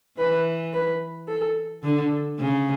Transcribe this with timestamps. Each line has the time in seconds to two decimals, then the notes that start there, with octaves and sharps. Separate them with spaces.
0.18 E3 B4
0.73 B4
1.28 A4
1.83 D3 A4
2.39 C#3